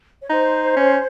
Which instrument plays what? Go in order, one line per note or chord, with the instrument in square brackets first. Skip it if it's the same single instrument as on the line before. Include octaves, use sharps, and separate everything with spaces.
[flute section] C#5
[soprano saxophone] D#4 [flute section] C5
[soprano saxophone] C#4